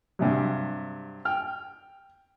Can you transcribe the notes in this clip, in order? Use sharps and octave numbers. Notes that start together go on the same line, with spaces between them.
G2 C3 F#3
G5 F6